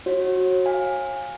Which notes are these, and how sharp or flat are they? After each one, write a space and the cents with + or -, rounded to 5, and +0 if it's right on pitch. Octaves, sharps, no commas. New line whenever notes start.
F#4 +0 C#5 -35
F5 +15 G#5 -15